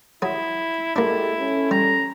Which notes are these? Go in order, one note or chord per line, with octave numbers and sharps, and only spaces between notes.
F#3 E4 G#4
G#3 A#3 D4 E4 G4 A4
C#4 A4
G3 A#5